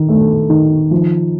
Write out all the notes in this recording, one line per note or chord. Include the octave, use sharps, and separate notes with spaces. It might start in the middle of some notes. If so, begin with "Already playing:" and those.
Already playing: D#3
A3
D#3
F3